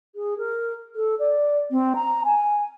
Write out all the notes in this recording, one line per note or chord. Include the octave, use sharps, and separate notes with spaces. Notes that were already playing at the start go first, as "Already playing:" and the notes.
G#4
A#4
A4
D5
C4
A#5
G#5